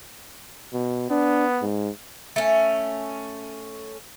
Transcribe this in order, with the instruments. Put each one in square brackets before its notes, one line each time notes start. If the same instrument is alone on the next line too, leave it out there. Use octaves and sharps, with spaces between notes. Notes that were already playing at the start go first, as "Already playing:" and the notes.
[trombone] B2
[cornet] B3 [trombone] D4
[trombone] G#2
[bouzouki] A3 C#4